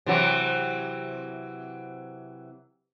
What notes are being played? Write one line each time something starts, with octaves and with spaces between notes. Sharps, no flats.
C3 E3 F#3